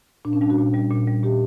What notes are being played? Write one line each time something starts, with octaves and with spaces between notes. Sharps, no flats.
A#2 D4
C#4
G3 D4
F#4
A#2
G3
A#2
G3
A#2 G4